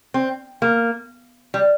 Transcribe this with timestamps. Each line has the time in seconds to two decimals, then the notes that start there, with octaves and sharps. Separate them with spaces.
0.14 C4
0.62 A#3
1.54 G3